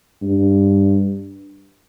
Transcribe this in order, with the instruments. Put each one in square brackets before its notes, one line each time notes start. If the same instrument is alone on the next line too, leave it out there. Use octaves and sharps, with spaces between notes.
[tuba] G2